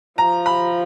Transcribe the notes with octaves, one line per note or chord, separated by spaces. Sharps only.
F3 A#5
B5